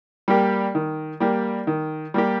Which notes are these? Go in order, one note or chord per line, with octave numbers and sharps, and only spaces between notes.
G3 A#3 G4
D#3
G3 A#3 G4
D#3
G3 A#3 G4